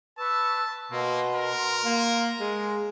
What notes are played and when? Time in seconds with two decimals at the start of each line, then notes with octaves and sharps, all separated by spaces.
0.18 B4 A5 C#6 E6
0.92 B2 A#3 C6
1.35 A#4
1.85 A#3
2.40 G#3